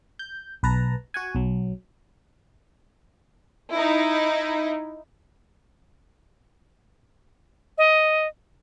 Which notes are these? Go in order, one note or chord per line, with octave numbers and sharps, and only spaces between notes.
G6
B1 B4 A5 A#5
F#4 F#5 G#5
B1 F#3
D#4 E4
D#5